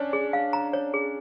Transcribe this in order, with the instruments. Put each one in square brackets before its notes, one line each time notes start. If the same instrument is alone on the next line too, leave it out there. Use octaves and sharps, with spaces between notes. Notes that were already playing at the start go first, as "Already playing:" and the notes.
Already playing: [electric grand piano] C#4 D4 [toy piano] C#5
[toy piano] G#4
F5
A#5
C#5
G#4